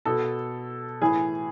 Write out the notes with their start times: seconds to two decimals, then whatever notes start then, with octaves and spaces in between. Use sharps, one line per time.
0.05 B2 A4
1.01 A2 E3 G#4